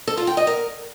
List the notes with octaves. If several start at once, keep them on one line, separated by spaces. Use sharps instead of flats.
A4
F4
G5
D#5
A#4